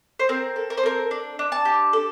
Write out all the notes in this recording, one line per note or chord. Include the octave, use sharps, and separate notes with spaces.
C5
C4 A#4
A4
A#4
C5
C4 A#4
D4
D4
A5
G4
A4